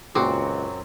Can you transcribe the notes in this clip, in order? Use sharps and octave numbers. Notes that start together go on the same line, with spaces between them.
C#2 F#2 A#2 F#3 C4 F#4 D6